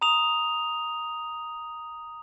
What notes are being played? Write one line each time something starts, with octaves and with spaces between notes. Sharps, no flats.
A#5 D#6 F7